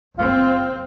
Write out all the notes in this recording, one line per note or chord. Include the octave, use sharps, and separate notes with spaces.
F#1 C4 F4